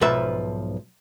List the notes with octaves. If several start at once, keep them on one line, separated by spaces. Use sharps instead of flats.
B1 G#2 F3 B4 E5